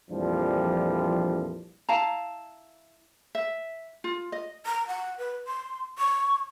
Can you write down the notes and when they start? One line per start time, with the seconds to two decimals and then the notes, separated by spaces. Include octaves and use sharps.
0.11 A#1 F2 E3 F3 G3 D4
1.89 E4 F5 A5 A#5
3.35 E5
4.04 F4
4.32 D#5
4.66 A#5
4.87 F#5
5.18 B4
5.47 C6
5.99 C#6